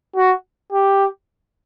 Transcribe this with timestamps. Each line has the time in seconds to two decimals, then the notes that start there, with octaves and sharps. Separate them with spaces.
0.16 F#4
0.72 G4